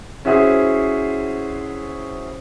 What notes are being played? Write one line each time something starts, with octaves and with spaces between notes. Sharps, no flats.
C#4 E4 F#4 G#4 C5